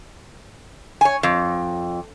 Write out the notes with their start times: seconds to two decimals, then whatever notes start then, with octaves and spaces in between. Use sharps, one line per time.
1.01 C#5 G#5
1.23 F2